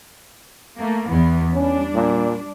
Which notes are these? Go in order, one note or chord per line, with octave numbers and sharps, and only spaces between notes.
A3 A#3
E2 E3 B3
G3 C#4 D4
A#2